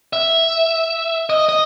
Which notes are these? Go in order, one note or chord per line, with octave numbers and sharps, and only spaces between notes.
E5
D#5
D#5